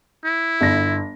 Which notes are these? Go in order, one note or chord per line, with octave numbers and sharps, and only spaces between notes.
E4
G1 A#6